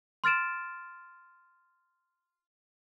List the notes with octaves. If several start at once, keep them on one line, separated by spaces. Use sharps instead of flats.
C6 F6 A6 D7 E7